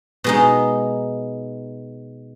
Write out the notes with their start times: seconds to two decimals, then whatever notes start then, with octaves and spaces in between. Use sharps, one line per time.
0.24 B2 G#3 D#4